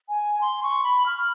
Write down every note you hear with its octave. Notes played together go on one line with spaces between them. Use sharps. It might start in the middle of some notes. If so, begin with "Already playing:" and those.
G#5
C6
C#6
B5
F6